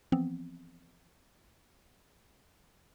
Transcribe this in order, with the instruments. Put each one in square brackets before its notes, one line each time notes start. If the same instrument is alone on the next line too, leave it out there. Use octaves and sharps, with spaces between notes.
[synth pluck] E3 F3 B3 C4